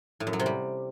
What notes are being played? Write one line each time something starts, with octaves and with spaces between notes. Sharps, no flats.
A2
F#2
F#3
C3
G3